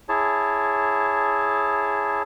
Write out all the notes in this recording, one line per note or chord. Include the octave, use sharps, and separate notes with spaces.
E4 G#4 C#5 A5